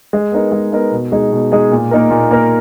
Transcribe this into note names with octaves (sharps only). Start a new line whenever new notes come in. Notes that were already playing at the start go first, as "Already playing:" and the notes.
G#3
B3 D#4 A#4
G#3
B3 D#4 A#4
B2
G#3 D#4 G#4
B2
G#3 D#4 G#4
A#2
A#3 D#4 A#4
A#2
A#3 D#4 A#4